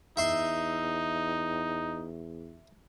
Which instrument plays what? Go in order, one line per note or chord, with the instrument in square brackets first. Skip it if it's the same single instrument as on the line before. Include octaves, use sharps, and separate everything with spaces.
[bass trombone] E2 [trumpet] D#4 [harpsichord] E5 C6